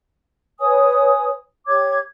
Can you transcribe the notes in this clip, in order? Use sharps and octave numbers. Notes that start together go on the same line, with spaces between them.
B4 C#5 G#5 D#6
G4 C#5 D6 G#6